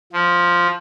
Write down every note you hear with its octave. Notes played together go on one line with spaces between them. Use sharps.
F3